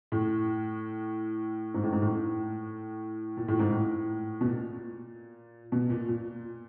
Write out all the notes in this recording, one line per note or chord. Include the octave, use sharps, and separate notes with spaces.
A2
G#2
A2
G#2
A2
A#2
A2
G#2
A2
B2
A#2
B2
A#2
A#2